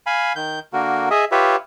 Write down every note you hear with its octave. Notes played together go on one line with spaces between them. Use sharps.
F5 G#5 B5
D#3 G6
D3 A#3 F#4 A#4
G#4 D#5 E5
F4 G4 B4 C#5 E5